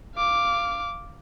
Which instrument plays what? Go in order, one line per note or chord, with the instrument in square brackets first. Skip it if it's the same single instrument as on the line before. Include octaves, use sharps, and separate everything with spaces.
[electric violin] F5 D6